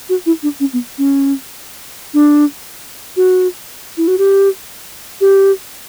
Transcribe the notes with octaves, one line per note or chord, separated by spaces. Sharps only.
F#4
E4
D4
C#4
B3
C#4
D4
F#4
E4
F#4
G4
G4